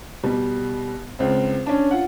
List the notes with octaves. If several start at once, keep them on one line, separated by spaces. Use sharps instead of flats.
B2 G3
C#2 C4
C#4 D4
F4 F#5